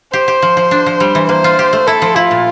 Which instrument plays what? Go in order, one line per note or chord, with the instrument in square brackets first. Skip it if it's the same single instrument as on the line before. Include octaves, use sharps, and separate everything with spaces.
[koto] G4 [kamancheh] C5
[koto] G4
F3
F3
D4
F3
G3
E3
[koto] A#3 [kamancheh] C5
[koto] F4
G4
A3
[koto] E4 [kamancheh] A4
[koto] F3
[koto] E4 [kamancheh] F4
[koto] A#2